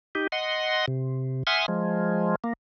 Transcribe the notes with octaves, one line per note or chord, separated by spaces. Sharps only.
D#4 G4
D#5 F#5 C6
C3
E5 F#5 G#5 C6 D#6 F6
F3 G#3
A#3